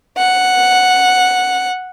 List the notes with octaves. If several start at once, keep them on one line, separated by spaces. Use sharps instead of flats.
F#5